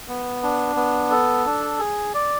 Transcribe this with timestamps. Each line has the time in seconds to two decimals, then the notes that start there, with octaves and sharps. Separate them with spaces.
0.08 B3
0.43 D4
0.76 B3
1.11 A4
1.45 D4
1.79 G#4
2.14 D5